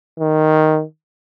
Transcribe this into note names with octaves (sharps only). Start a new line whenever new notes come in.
D#3